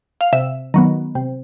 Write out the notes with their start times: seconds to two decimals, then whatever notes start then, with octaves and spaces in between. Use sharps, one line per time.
0.21 F5
0.33 C3 E5
0.74 D#3 F#3 B3
1.15 C3